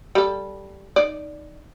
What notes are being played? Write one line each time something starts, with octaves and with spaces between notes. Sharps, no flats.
G3 A4
D#4 D5